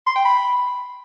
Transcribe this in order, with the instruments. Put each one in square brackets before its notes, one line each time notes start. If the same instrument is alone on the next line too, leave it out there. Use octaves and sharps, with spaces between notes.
[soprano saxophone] C6
G5
B5